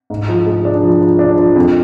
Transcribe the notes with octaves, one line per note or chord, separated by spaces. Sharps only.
G#2
F3
G#3
D4
F3
F3
D4
F3
F2